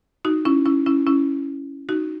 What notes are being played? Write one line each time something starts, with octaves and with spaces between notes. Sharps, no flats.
D#4 F#4
C#4 E4
C#4 E4
C#4 E4
C#4 E4
D#4 F#4